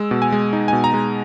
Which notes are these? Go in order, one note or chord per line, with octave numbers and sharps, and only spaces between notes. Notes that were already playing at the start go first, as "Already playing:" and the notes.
Already playing: G#3 E6
B2
G#5
G#3
D#4
B2 G#5
A#5
G#3